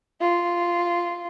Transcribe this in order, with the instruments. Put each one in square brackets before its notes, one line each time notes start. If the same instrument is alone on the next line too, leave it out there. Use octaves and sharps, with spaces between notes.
[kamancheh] F4